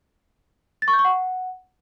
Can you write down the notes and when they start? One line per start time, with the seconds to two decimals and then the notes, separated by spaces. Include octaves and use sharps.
0.82 A6
0.88 C#6
0.93 G6
0.99 C#6
1.05 F#5